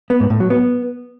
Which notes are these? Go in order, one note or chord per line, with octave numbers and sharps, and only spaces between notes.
B3
G#2
A2
F#3
B3